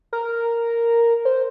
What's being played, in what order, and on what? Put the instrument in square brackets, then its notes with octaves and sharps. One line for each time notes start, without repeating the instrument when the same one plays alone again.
[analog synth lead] A#4
C5